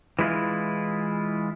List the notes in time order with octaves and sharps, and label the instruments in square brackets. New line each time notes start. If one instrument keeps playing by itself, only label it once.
[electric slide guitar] E3 G#3 E4 F4